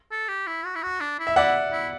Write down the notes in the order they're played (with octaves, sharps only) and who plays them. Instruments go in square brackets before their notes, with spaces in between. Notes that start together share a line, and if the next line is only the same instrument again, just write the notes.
[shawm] A4
G4
E4
F#4
E4
F#4
D4
E4
[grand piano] E5
[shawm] E4 [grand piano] D5 F#5
[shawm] E4